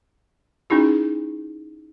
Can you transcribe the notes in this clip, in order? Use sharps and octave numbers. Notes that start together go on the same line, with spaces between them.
C#4 D#4 E4 F#4 G#4